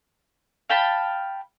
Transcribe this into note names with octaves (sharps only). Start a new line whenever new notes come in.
F5 G5 A5 B5